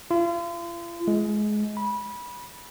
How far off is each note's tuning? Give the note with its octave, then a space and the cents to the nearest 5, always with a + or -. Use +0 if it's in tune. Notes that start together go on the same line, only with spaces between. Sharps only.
F4 -40
G#3 +20
B5 -20